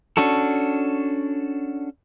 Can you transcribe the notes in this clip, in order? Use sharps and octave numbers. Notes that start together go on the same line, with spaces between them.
C#4 D4 F#4 A4